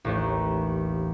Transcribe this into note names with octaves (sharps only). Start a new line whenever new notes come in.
A1 D#2